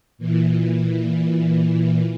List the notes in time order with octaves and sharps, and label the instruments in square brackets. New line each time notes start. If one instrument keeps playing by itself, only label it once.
[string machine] A#2 E3